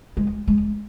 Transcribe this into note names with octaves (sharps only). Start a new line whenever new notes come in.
G#3
G#3